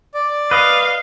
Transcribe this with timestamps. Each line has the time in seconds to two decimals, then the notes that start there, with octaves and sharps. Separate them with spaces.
0.14 D5
0.51 B4 D#5 F5